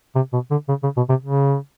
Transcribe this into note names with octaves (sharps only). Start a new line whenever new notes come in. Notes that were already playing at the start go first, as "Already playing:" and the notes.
C3
B2
D3
C#3
C#3
B2
C3
C#3